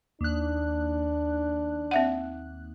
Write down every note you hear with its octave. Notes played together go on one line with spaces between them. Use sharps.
D#2 D4 F#6
C4 E5 F#5